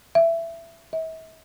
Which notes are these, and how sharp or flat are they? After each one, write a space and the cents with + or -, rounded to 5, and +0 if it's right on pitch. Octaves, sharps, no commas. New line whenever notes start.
E5 +15
E5 -40